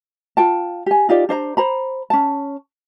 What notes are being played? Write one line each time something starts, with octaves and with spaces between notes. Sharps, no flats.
F4 G5 A5
G4 G#5
D#4 F4 G4 D5
D4 C5 D#5 A#5
C5 A#5 B5
C#4 A5